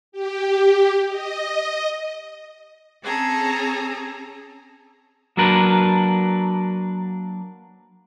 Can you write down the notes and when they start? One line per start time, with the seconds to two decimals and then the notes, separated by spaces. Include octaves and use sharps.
0.12 G4
1.09 D#5
3.01 C4 C#4 G#4 A4 A#5
5.37 F#3 A#3 D4 A#4 B4